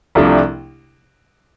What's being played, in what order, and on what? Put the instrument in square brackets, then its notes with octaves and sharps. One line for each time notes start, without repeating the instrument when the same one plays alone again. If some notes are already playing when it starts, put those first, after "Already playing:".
[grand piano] C2 C3 F3 A3 D4